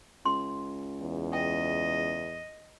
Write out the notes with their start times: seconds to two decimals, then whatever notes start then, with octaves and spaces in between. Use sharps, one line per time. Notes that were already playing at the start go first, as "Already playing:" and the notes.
0.25 C#2 C6
1.01 E2
1.33 D#5 G5